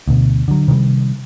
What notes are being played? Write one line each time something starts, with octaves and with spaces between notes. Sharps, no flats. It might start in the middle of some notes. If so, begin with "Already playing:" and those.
D2 B2
D3 F#3
C3 D#3 F#3 G3